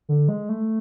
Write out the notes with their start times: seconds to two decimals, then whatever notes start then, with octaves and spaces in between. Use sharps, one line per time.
0.09 D3
0.29 G#3
0.49 A3